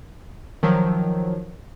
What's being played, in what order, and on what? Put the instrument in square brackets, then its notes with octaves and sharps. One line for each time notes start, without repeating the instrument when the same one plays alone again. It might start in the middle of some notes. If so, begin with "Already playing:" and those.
[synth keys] D#3 F3 F#3